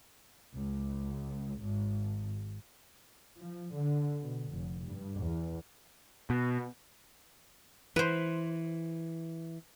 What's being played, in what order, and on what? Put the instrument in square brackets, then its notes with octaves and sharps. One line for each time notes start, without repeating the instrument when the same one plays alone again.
[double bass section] C#2
G#1
F3
D3
B2
F1
G2
E2
[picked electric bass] B2
[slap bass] E3 [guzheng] B4 C5